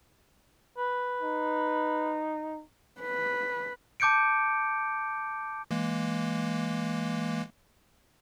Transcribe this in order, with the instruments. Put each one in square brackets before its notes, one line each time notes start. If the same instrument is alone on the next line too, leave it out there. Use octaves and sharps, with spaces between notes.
[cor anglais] B4
[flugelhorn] D#4
[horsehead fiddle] B4
[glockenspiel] A5 D6 G6 C#7 D7
[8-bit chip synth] E3 G#3 A#3